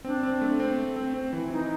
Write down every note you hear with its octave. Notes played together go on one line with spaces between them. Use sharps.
C4 D4
C4
A3
C4
A3
C4
C4
E3
E3 D#4